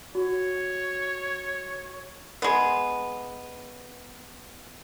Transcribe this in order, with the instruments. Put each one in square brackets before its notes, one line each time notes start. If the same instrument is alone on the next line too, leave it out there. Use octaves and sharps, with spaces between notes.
[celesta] F#4 [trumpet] C#5
[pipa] G#3 B3